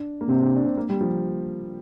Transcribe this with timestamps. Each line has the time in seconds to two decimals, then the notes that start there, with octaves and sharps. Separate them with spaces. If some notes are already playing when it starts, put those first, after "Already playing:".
Already playing: D4
0.21 A#3
0.28 C3 C4
0.40 D4
0.56 D4
0.65 C4
0.77 A#3
0.89 G3
1.01 F3